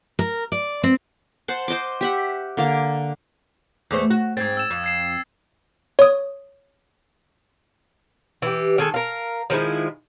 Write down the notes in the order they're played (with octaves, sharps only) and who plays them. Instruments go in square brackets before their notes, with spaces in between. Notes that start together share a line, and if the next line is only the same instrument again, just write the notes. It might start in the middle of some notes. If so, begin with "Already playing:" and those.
[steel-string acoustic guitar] A#4
D5
C4
[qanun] C5 F#5 A5
C5 D#5 C6 D6
G4 E5 F#5
D3 A#3 D6
[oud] E2 A3 C5
F#4
[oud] G#2 C4 [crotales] G#6 A6
[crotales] E6 E7
[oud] F2
[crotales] G#6 C7 E7
[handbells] C#5 D#6
[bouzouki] E3 G4
D#3 G#3 A4
A#4 F5
D#3 F3 G#3 E4